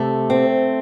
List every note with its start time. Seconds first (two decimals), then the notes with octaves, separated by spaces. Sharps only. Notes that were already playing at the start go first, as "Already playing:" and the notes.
Already playing: C3 A3
0.30 C4